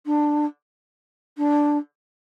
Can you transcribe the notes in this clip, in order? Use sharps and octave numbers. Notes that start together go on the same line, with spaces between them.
D4
D4